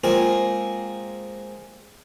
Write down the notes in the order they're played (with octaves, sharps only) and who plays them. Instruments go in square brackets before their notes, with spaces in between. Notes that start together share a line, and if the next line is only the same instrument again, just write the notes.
[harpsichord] G#3 A#3 C4 F4 G#4